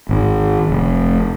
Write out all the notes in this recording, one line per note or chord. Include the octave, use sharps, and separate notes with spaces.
G#1
F1